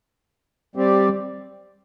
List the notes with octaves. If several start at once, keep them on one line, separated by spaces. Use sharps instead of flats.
G3 C4 G4 D5